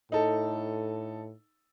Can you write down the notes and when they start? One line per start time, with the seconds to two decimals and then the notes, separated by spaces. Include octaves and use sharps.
0.12 A2 D#4 A4